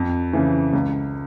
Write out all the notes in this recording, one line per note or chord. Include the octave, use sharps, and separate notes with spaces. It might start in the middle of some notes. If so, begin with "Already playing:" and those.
Already playing: F2
C#3 E3
C#2